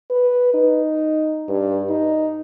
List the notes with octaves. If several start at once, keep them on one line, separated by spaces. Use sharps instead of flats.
B4
D#4
G2
D#4